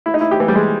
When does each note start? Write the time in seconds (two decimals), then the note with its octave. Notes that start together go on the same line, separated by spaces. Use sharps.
0.06 E4
0.14 D#4
0.21 E4
0.31 G4
0.40 E3
0.48 G3
0.55 G#3